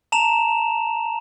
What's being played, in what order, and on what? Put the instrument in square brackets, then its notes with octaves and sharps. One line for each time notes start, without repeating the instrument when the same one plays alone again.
[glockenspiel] A5 A#5 E7 F7